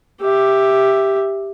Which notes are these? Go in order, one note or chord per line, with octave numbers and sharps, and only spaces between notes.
G4 E5